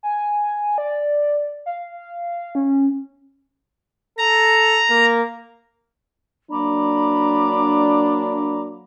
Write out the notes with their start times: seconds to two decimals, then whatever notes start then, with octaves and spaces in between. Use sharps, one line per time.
0.03 G#5
0.78 D5
1.66 F5
2.55 C#4
4.18 A4 A#5
4.90 A#3
6.50 F#3 A#3 D4 A#5 B5 D6